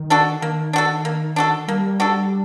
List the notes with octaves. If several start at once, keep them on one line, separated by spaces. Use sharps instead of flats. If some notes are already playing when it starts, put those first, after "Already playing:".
Already playing: D#3
D4 F#4 A4
D#3 A#3
D4 F#4 A4
A#3
D4 F#4 A4
G3 A#3
D4 F#4 A4